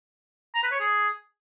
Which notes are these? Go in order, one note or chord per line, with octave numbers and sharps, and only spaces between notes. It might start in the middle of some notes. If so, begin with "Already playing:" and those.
A#5
B4
C#5
G#4